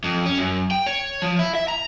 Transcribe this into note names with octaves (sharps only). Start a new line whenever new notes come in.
F2
C#4
F#2
G5
C#5
F3
E4
E5
A#5